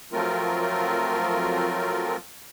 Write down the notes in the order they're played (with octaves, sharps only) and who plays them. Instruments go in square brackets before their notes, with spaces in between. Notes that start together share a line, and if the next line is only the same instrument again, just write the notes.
[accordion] F3 F#3 A3 C4 F4 A#4